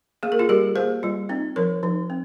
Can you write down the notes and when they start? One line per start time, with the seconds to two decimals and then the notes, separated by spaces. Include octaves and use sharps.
0.23 A#3 G#4
0.32 A#4
0.39 F4 G#4
0.49 G3 G4 A#4
0.76 A#3 G#4 C5
1.03 G3 F4
1.29 C4 D#4
1.56 F3 A#4 C#5
1.83 F3 D#4
2.10 C4